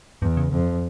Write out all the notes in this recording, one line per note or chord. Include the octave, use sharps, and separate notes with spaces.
E2 G2
C#3
F2